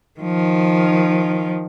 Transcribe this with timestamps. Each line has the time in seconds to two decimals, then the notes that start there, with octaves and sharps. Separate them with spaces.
0.20 D#3 F3